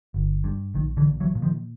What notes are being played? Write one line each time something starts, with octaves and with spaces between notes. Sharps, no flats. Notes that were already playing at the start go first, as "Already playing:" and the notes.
G1
G2
A#1 D#3
D3 E3
A#2
E3 F#3
A#2
D#3 F3